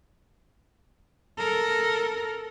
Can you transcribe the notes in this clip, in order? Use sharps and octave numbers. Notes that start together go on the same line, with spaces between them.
A4 A#4